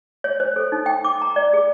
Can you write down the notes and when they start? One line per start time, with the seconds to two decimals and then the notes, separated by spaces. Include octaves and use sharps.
0.24 C#5
0.40 C5
0.56 A4
0.72 D#4
0.86 G5
1.04 D6
1.22 A#5
1.36 D5
1.53 G#4